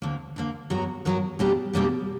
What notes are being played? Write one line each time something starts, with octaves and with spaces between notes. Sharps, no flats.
D2 D3 A#3
D2 D3 A#3
G2 F#3 B3 F#4 A#4
G2 F#3 B3 F#4 A#4
B2 G3 A#3 D4 G4
B2 G3 A#3 D4 G4